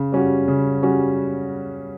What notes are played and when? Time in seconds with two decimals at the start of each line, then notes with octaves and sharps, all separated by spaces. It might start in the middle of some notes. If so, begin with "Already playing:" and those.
Already playing: C#3
0.12 G3 C#4 F#4
0.48 C#3
0.83 G3 C#4 F#4